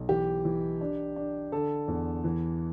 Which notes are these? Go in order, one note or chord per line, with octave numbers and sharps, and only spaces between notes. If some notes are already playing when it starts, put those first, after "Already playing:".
Already playing: B1
E3 G4
E3
D4
D4
D3 A4
E2
E3